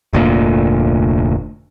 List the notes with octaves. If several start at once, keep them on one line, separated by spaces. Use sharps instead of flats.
F1 D2 A#2